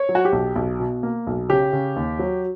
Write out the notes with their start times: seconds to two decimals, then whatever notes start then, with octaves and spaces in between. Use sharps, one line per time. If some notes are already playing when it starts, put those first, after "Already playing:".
Already playing: C#5
0.09 F#3
0.15 F#4
0.25 G4
0.32 B1
0.56 B1
0.80 B2
1.03 A#3
1.27 B1
1.49 C#3 G4
1.73 C#3
1.96 D#2
2.19 F#3